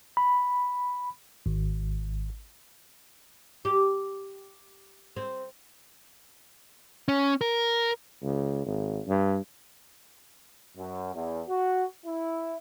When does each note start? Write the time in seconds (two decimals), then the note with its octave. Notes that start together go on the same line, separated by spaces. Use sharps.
0.17 B5
1.46 G#1
3.65 G4
5.16 C4
7.08 C#4
7.41 A#4
8.22 C#2
8.66 G#1
9.07 G2
10.77 F#2
11.15 E2
11.49 F#4
12.06 E4